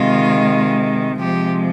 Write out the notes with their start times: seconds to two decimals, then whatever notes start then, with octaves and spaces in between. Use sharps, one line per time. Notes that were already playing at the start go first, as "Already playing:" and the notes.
Already playing: C3 D#3 G#3 F4
1.20 C3 F3 G#3 G4